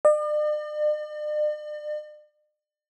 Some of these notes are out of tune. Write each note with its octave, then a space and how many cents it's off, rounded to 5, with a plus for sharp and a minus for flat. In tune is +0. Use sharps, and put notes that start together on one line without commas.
D5 +45